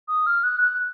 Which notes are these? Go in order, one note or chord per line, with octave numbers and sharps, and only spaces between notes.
D#6
F6
F#6
F#6